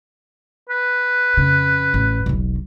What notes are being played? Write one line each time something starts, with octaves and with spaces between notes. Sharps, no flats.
B4
F2 C#3
A1
E1 B1